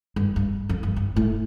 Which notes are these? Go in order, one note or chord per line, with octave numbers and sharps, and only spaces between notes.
G2
G2
F2
G2
G2
A2